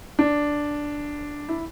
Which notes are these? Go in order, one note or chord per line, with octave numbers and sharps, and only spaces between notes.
D4
E4